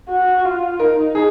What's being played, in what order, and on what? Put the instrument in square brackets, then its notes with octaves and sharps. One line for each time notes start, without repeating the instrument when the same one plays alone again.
[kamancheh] F#4
F4
[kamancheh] D#4 [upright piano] A#4
[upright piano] G#4